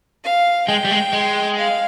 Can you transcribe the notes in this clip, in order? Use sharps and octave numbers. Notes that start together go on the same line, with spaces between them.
F5
G#3 G5
G3
G#3
G#3
F5